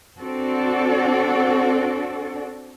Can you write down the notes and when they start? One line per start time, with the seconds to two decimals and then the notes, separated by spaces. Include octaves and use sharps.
0.19 C4 D4 F#4 A4 D5